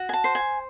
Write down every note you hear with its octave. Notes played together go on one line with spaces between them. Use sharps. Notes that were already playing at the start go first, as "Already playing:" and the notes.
Already playing: F#4
G#5
A5
C5
G#5